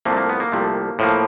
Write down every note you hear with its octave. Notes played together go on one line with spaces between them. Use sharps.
C2 C3 F3 A3 A#3
A#3
B3
A#3
C2 C3 F3 A3
A2 F3 A#3